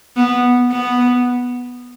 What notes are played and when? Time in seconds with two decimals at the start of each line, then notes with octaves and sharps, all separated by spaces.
0.16 B3
0.71 B3